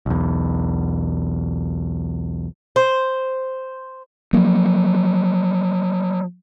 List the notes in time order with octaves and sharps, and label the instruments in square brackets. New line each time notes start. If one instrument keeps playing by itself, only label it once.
[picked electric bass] B1 E2
[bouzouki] C5
[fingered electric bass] F3 F#3 A#3